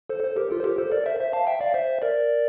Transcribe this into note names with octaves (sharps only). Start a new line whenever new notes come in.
A4 C5
A4 C5
G4 A#4
F4 A4
C5
G4 A#4
A4 C5
A#4 D5
C5 E5
C5 E5
F5 A5
E5 G5
D5 F5
C5 E5
A#4 D5